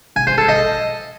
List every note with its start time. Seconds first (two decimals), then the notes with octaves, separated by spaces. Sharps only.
0.16 G#5
0.27 C5
0.38 A4
0.49 D#5